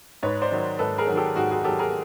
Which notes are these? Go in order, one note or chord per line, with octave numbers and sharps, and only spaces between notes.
G#2 B4 C#5
C5 D5
D#3 F#3
G#2 A4 B4
G#4 A#4
D#3 F#3
G4 A4
G#2 F#4 G#4
F#4 G#4
D#3 F#3 G4 A4
G#4 A#4